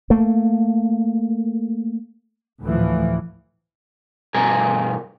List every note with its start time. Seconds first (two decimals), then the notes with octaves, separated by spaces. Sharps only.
0.10 A3 A#3
2.64 D2 A2 E3 F3
4.34 G2 B2 A#4 G#5